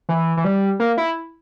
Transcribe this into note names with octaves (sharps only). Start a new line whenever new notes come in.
E3
E3
G3
A#3
E4